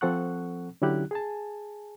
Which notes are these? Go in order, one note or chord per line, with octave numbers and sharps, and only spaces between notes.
F3 C4 A4 F#5 C#6 F#6
D3 F#3 C#4 E4 G4 F#6
G#4 G#5 A5